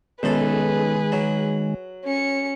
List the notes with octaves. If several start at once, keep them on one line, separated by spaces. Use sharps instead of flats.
B1 F#2 D#3 G#3 G#4 A4 B4
F#3
C#4 C#7